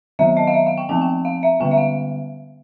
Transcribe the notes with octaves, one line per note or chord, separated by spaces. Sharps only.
D#3 F#3 B3 E5
D#5
F5
E5
F5
G5
F3 A3 C4 G#5
G5
F5
E5
D3 G3 B3 G5
E5
F5